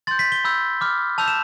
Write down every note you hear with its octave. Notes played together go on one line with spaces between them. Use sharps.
C6 G6 A6
B6
G7
B5 E6 G6
B5 D6 F6
A5 E6 G6 F7
E7